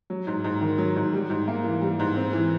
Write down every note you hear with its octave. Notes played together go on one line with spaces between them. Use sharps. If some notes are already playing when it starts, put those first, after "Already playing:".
F#3
G#2
G#2
D#3
F#3
G#2
G3
G#2
A#3
E3
G3
G#2
C4
E3